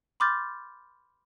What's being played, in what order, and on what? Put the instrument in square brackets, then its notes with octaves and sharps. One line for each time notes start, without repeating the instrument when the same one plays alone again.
[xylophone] B5 C6 D6 F6 G6 A6